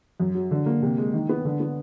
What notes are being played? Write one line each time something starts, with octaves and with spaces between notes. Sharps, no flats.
F#2
F#3
D3
A#3
C3
G#3
D#3
B3
D3
B3